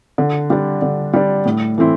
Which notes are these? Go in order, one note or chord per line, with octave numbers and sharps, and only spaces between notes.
D3
G3 D4
D3
G3 D4
A2
E3 A3 C4 E4